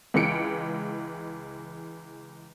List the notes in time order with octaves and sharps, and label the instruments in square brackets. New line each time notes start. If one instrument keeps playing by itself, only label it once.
[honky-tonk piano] C#2 E3 G#3 C#7 D7